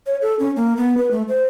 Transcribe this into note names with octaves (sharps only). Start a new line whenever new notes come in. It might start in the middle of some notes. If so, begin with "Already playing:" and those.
C#5
A4
C#4
A#3
B3
B4
A3
C5